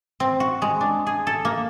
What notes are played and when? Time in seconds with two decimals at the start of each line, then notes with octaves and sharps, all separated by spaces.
0.20 C4
0.40 F#4
0.62 G#3
0.81 D4
1.07 G#4
1.27 A4
1.45 A#3